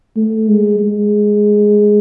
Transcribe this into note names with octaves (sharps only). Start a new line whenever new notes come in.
A3
G#3
G#3